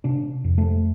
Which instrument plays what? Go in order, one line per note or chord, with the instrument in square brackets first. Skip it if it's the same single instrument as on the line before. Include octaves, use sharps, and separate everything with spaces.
[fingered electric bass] C3 D4
F2
A3